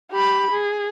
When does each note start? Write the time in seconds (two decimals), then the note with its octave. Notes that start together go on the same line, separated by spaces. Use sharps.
0.11 G4 B5
0.50 G#4